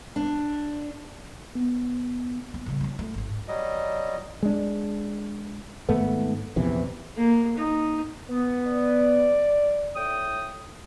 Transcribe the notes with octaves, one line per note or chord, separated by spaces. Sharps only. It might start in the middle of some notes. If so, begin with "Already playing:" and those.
D4
B3
B3
C#3 G3
B3 C#4
A3
G#1 G#2
F#3 G3 D#5
G#3 D4
G#1 G#2 A3 B3
A#1 E2 C3 E3
A#3
D#4
B3
D5
A2 G5 D#6